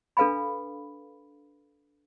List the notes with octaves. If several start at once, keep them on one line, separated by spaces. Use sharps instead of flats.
D4 A4 B4 F5 G#5 B5